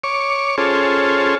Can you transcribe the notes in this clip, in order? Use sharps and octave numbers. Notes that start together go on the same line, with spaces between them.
C#5 C#6 D6
C#4 F4 G#4 A4 C5 C#5